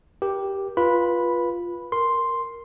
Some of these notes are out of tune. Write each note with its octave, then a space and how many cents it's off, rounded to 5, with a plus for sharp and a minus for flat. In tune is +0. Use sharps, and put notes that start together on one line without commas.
G4 +0 A#4 +35
F4 +0 B4 -20 B5 +0
A#4 +0 C6 +0